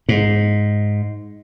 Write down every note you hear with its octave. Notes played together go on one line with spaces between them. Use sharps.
G#2